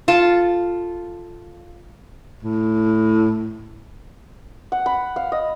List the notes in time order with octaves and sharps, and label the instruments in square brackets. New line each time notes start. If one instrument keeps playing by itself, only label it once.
[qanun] F4 A4 A5
[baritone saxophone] A2
[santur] F#5
B5
F5
D#5